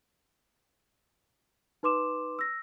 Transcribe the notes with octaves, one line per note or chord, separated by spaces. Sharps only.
D#4 B4 C6 D6 E7
E6 A#6